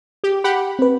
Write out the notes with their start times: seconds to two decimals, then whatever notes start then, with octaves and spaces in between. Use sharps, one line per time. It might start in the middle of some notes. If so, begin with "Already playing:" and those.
0.24 G4
0.44 G4 F#5 B5
0.79 C4 B4